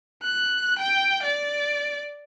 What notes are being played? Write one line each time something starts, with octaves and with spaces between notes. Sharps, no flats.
F#6
G5
D5